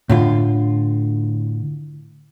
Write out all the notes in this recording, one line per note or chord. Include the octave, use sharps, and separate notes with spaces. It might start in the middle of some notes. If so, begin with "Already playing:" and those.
A2 D3 F4